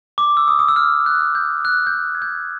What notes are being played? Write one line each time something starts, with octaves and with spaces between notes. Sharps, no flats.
D6
E6
D#6
D#6
E6
F6
F#6
G6
F#6
G6
F#6
G#6
G6